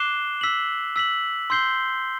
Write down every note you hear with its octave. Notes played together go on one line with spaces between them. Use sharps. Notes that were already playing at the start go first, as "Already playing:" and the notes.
Already playing: D6 F#6 C7 E7 G7
E6 B6 F#7
E6 B6 F#7
C6 E6 G6 C7 G7